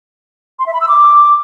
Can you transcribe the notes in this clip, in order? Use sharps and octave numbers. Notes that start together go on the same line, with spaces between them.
C6
E5
B5
E6
D6